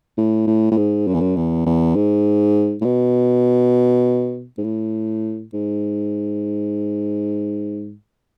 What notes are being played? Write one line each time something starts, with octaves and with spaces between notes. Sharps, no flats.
A2
A2
A2
G#2
F#2
E2
F#2
E2
E2
G#2
A2
B2
G#2
A2
G#2